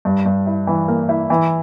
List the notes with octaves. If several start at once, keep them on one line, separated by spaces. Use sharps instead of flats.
G2
G2
E4
E3
A#3
E4
E3